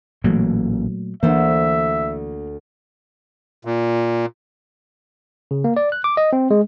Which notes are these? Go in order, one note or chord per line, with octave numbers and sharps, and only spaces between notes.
A1 A#2 E3 F#3 A3 A#3
D2 E3 A#3 D4 C5 E5
A#2
C#3
A#3
D5
F#6
D6
D#5
C4
G#3